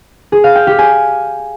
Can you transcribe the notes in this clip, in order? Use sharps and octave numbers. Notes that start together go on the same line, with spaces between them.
G#4
F5
G5
G4
G#5